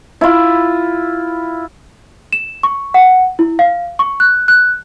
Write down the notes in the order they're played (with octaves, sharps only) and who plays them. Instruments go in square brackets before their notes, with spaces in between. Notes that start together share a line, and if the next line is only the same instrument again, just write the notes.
[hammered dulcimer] E4 F4
[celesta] E7
C#6
F#5
E4
F5
C#6
F#6
F#6